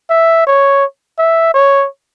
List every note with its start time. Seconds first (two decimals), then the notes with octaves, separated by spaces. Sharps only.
0.10 E5
0.47 C#5
1.19 E5
1.54 C#5